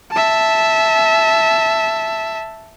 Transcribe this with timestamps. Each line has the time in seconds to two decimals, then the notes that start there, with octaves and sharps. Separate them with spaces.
0.12 E5 A5